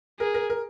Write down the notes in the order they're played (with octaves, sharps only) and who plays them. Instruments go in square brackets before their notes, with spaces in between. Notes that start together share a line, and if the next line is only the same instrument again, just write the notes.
[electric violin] G#4 [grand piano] A#4
[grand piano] A#4
A#4